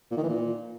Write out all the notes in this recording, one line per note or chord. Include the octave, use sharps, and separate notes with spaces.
A#2
D#3
E3
A#2